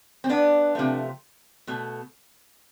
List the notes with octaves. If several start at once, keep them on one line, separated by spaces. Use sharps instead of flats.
C4
B3 D4
C3 F3 A3
B2 A3